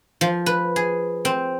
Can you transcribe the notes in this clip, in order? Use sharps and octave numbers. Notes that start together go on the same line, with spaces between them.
F3
B4
G#4
C4